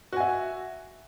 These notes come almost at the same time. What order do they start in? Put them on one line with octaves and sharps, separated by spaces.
F#4 G#5 E5